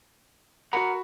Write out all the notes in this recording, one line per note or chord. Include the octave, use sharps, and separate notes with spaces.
F#4 A#4 F#5 A#5 B5